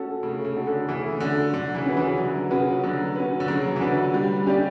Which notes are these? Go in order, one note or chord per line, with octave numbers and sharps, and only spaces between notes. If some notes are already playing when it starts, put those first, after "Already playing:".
Already playing: A3 C#4 F#4 A4
C#3 A3
C#3
C#4 F#4 A4
D3
C#3 E3 A3
D3 C#4 F#4 A4
D3 F#3
C#3 E3
C#4 F#4 B4
C#3 E3
D3 F#3
C#3 C#4 F#4 B4
D3 F#3
C#4 F#4 B4
D3
C#3 F#3
E3
D3 C#4 F#4 B4
G3
C#4 G4 D5